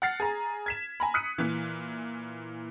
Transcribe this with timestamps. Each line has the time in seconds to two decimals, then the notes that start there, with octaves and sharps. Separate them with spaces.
0.02 F#5 F6 A6 C7
0.20 G#4 A#5
0.66 G#6 B6 E7
1.00 G#5 A#5 B5
1.14 D#6 F#6 B6 C#7 D#7
1.38 A#2 E3